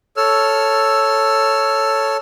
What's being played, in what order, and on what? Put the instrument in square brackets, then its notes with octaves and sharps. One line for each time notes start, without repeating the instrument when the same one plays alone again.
[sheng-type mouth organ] A4 C#5 E6 F6